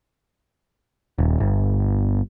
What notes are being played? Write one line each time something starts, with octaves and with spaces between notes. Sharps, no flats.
D#1
G1